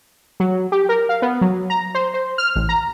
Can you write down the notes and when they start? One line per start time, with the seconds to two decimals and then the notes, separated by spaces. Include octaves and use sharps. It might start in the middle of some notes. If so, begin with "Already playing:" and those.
0.40 F#3
0.72 G4
0.89 A#4
1.09 F5
1.22 B3
1.41 F#3
1.70 A#5
1.95 C5
2.14 C5
2.38 F6
2.55 A1
2.69 A#5